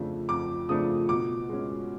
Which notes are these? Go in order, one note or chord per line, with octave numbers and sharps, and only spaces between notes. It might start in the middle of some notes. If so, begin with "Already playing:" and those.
Already playing: F2 C#3 F3 A3 D4
F2 D6
C#3 F3 A3 D4 D#6
B2 D6
G#3 C#4